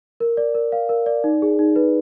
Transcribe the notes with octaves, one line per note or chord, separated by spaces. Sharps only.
A#4
D5
A#4
F5
A#4
D5
D#4
G#4
D#4
B4